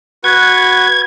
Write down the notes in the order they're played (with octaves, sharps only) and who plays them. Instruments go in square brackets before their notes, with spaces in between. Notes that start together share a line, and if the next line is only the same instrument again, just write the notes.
[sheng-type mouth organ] F#4 B4 F#5 [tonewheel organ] G#6